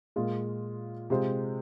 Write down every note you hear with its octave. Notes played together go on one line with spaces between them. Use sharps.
A#2 G#3 F4
C3 G#3 F4 C5